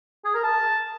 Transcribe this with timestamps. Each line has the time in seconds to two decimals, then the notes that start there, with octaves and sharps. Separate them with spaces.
0.25 G#4
0.34 A#4
0.43 A5